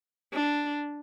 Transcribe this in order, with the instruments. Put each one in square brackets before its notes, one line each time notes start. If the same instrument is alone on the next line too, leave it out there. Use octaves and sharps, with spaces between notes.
[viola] D4